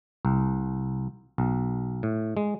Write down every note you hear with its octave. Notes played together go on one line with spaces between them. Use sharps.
C2
B1
A2
G#3